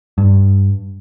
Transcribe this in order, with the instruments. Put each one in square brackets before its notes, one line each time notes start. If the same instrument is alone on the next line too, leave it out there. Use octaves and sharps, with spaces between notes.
[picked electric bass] G2